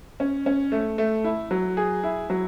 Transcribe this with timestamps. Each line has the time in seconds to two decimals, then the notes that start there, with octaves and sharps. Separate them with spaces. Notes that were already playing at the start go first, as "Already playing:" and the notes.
0.20 C#4
0.46 C#4
0.72 A3
0.98 A3
1.24 E4
1.51 F#3
1.77 G#4
2.04 E4
2.30 F#3